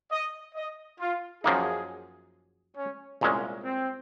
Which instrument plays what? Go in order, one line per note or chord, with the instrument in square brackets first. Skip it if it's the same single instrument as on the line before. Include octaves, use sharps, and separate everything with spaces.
[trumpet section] D#5
D#5
F4
[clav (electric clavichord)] F#2 F3 A#3 D#4 [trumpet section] G#4
[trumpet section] C#4
[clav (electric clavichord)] C2 A#2 G#3 C#4
[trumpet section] C4